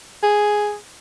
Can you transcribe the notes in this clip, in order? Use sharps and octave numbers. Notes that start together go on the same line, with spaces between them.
G#4